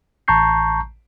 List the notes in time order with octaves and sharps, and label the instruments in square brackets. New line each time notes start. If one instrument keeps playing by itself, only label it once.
[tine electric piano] A1 A5 A#5 C#6 G6 C7